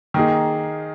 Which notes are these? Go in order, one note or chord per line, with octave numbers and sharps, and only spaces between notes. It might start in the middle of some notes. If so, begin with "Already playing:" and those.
D#3 A#3 D#4 G#4